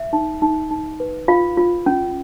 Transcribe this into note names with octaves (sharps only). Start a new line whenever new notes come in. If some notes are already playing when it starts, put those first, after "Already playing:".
Already playing: E5
D#4
D#4
D#4
B4
F4 F5
F4
C#4